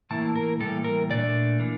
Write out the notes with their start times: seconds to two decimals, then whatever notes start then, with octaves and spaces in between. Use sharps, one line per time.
0.10 A2 E3 A#3 E4 A5
0.36 A#4
0.59 A2 E3 G3 A#3 A4
0.84 A#4
1.09 A#2 A3 D4 D5
1.60 E3 A#3 D4